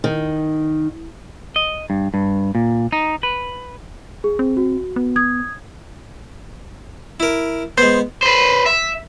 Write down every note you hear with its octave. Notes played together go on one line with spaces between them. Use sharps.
D#3
D#5
G2
G2
A#2
D#4
B4
G#4
C4
F#4
B3
D#6 G#6
E4 A#4
G#3 B3 C5
B4 C5
E5